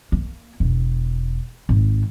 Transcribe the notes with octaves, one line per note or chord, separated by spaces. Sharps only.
A#3
E1
G#1